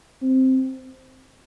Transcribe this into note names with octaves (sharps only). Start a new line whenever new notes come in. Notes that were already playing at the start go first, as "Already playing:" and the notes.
C4